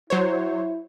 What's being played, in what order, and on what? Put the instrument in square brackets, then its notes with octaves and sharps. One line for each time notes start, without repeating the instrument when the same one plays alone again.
[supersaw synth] F#3 C5 C#5 [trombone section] E4